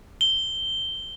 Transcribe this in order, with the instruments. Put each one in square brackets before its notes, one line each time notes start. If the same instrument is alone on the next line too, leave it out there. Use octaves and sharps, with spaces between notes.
[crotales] G7